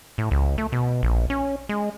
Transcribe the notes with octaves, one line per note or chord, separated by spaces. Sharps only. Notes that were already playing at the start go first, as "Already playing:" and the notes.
A2
C#2
A3
B2
A#1
C#4
G#3